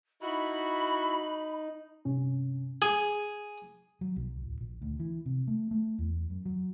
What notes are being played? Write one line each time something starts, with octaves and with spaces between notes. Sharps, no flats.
D#4 E4 F#4 B5
G2 C3 C#4
G#4
F#3
B1
D1
A#1
D2
E3
C3
A3
A3
E2
F#2
F#3